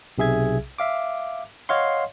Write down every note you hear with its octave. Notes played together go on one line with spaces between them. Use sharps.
B1 C3 G#4 E5 G#6
E5 F5 D6
C#5 D#5 F5 F#5 C6